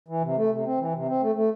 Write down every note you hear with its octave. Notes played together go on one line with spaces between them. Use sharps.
E3
C3
A3
C3
C4
E3
C3
C4
A3
A3